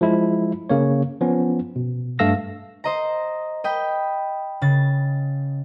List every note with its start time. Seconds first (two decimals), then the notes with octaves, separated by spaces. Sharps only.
0.01 F3 G#3 E4
0.69 C#3 A#3 C#5
1.21 F3 B3 C#4
1.76 B2
2.19 G2 A3 A4 F5 E6 A#6
2.84 C5 D#5 A#5
3.64 D#5 G5 B5
4.61 C#3 A6